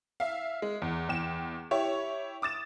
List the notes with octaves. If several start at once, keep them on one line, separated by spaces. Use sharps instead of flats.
E5 F5
G#3
E2
E2 G5 E7
E4 G4 C#5
D6 D#6 A6 E7